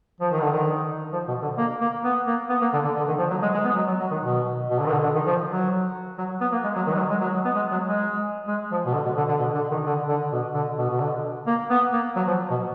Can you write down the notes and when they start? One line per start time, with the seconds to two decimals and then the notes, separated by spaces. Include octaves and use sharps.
0.20 F3
0.31 D#3
0.41 D3
0.52 D#3
1.12 F3
1.28 B2
1.42 D3
1.57 A#3
1.80 A#3
2.04 B3
2.27 A#3
2.49 B3
2.61 A#3
2.73 D3
2.84 D3
2.96 D3
3.08 D#3
3.18 F3
3.30 F#3
3.42 G#3
3.54 G#3
3.64 B3
3.76 F#3
3.88 F#3
3.99 F#3
4.11 D#3
4.22 B2
4.70 B2
4.79 D3
4.86 D#3
4.91 D3
5.02 D3
5.14 D#3
5.26 F3
5.48 F#3
6.18 F#3
6.41 B3
6.52 A#3
6.64 G#3
6.76 F#3
6.86 D#3
6.93 G#3
6.98 F#3
7.10 G#3
7.21 F#3
7.45 B3
7.55 G#3
7.71 F#3
7.86 G#3
8.47 G#3
8.71 F3
8.86 B2
8.94 D3
9.05 B2
9.17 D3
9.28 D3
9.39 B2
9.54 D3
9.71 D#3
9.86 D3
10.08 D3
10.32 B2
10.54 D3
10.78 B2
10.89 B2
11.01 D3
11.47 A#3
11.70 B3
11.93 A#3
12.16 F#3
12.27 F3
12.50 B2